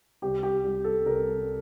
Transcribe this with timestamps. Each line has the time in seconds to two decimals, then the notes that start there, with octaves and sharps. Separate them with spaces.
0.22 C2 G4
0.43 G4
0.65 G3
0.84 A4
1.06 C2 A#4